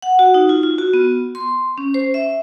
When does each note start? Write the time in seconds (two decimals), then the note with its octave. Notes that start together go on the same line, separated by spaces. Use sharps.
0.02 F#5
0.19 F#4
0.34 D#4
0.49 F4
0.63 F4
0.78 F#4
0.93 B3
1.35 C6
1.78 C#4
1.94 C5
2.14 E5